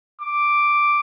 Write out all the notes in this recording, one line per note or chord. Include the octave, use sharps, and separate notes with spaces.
D6